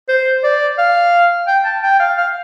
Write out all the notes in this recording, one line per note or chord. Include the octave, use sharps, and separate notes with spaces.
C5
D5
F5
G5
A5
G5
F5
F5